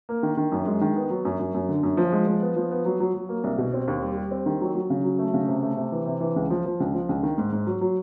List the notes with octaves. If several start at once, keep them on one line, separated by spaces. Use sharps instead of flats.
A#3
D#3
D#3
F#2
G#3
D#3
B3
F#3
F#2
F#2
F#2
D3
F#2
F3
G#3
F3
B3
F3
B3
F#3
F#3
F#3
A#3
C2
B2
C4
D#2
G3
G3
C4
D#3
F#3
F#3
C#3
F#3
A3
C#3
C3
A3
C3
E3
C3
E3
C#2
F3
F3
C#2
F3
C#2
D#3
G#2
G#2
F#3
F#3